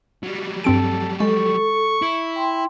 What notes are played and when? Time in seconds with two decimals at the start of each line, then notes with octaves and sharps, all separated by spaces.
0.23 F#3 G3
0.64 G2 C4 A4 D7
1.20 G#3 A4 C#6
2.02 E4
2.36 G5 C6